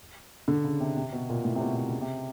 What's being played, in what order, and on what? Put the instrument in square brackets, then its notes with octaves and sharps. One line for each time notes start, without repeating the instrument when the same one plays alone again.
[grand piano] D3
C#3
C3
C3
B2
A#2
A2
C3
B2
C3
C#3
C3